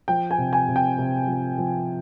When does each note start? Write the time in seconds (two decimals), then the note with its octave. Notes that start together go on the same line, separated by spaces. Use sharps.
0.08 F3 G5
0.31 G#5
0.38 C3
0.53 G#5
0.68 C3
0.76 G5
0.98 C3
1.28 F3
1.58 F3